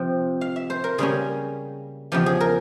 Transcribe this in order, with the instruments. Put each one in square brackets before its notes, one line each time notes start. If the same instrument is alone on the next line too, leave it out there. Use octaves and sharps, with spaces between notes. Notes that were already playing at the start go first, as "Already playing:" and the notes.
Already playing: [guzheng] C3 F3 C4 G5
F5
E5
C5
A#4
C#3 G3 A#3 C#4 G#4
E2 C#3 F3 G4
G#4
A#4